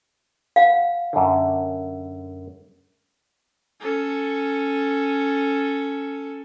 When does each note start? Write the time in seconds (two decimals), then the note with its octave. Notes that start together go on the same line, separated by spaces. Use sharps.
0.56 F5 F#5
1.13 F#2 D3
3.80 C#4 A4